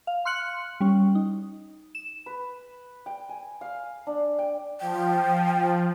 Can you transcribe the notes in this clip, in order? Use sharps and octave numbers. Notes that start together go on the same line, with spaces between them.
F5
C6 F6 F#6 C#7 F#7
G3 C#4
D#4
E7
B4
G5
G#5
F5
D4
G5
F3 G5